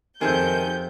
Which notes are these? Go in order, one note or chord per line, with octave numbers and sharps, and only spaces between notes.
F2 C3 D#3 G#4 A4 E5 G6